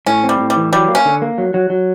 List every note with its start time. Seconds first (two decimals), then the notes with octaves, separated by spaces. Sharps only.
0.06 A2 C#4
0.24 C4
0.29 G3
0.39 A2
0.50 G3
0.56 E3
0.73 F#3 G3
0.88 A#3
0.95 C#4
1.05 D3
1.22 A#3
1.38 F#3
1.54 F#3
1.70 F#3